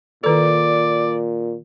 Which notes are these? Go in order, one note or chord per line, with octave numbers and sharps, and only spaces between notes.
A#2 D#3 A4 D5